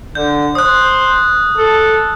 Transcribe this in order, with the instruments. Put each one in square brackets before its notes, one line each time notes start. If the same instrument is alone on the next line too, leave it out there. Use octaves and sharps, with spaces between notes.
[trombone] D3 [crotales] G6
[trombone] C5 [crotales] D#6 F#6
[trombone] A4